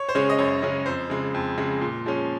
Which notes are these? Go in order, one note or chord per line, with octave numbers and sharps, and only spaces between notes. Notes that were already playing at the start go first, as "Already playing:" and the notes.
Already playing: C#5
C5
C#3 G#3 C#4 C#5
D#5
F#2 C#5
C#3 G#3 C#4
F2 C5
C#3 G#3
F2
C#3 G#3
A#2
F3 G#3 C#4